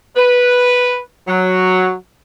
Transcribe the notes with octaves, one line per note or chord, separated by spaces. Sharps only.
B4
F#3